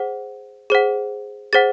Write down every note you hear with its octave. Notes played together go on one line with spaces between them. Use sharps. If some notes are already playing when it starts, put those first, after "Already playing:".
Already playing: G#4 C5 F#5
G#4 C5 F#5
G#4 C5 F#5 A6